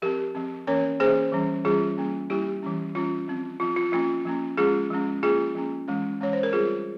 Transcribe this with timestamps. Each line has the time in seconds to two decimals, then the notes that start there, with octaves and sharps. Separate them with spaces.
0.02 F3 C4 G4 A#4
0.35 F3 C4
0.67 E3 A#3 C#4 A#4 C#5
1.00 E3 A#3 C#4 G#4 C5
1.32 E3 G3 C#4
1.65 E3 G3 C#4 F4 G#4
1.98 G3 A#3 C#4
2.30 G3 A#3 C#4 E4 G4
2.63 E3 G3 C#4
2.95 E3 G3 C#4 F4
3.28 F3 C4
3.60 F3 C4 F4
3.76 F4
3.92 F3 A#3 C#4 F4
4.25 F3 A#3 C#4
4.57 F3 G#3 C#4 F4 G#4
4.90 F3 G#3 C#4
5.23 F3 A#3 C#4 F4 G#4
5.55 F3 A#3 C#4
5.88 E3 G#3 C#4
6.21 E3 G#3 C#4 C#5
6.33 C5
6.43 A#4
6.53 G3 C4 F4 G#4